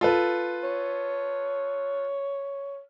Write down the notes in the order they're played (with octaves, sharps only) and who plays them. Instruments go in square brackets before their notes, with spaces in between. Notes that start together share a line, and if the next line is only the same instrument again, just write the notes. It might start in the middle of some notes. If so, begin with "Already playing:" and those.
[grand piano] F4 A4 B4
[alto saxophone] C#5